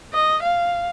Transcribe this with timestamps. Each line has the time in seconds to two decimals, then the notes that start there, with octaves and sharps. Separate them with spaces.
0.13 D#5
0.43 F5